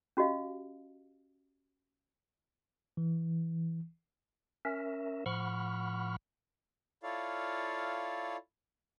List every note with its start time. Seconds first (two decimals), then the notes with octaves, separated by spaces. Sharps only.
0.17 C#4 F#4 G4 D#5 F5
2.97 E3
4.65 C#4 A#4 E5
5.26 A2 F3 F#5 B5 C#6 F6
7.03 E4 F4 A4 C#5 D5 F5